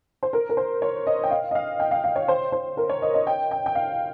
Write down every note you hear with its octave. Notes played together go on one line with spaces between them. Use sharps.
C5
A#4
A#4
C5
C#5
D#5
G5
F5
D#5
F5
G5
F5
F5
C#5
C5
C5
A#4
C#5
D#5
D#5
G5
G5
G5
F5